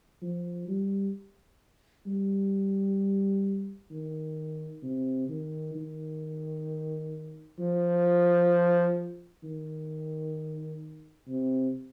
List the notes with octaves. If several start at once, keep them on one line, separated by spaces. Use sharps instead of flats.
F3
G3
G3
D#3
C3
D#3
D#3
F3
D#3
C3